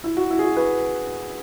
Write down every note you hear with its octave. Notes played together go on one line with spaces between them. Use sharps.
E4
F#4
E4
G#4
F#4
F#4 B4